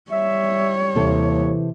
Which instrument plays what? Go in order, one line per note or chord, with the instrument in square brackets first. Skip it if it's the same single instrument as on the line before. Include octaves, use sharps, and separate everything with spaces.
[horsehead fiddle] G3 C#5 [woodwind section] E5
[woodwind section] D#2 [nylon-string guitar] C3 C4 A4 [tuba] E3